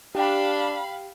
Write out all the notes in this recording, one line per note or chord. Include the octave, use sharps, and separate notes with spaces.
D4 G4 F5 G5 B5